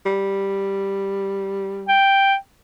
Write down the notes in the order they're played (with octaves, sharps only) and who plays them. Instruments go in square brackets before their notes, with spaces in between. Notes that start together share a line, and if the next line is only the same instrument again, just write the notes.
[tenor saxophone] G3
[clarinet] G5